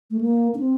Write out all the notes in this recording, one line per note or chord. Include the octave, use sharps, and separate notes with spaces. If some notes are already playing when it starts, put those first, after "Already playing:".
A3
A#3
D4
C4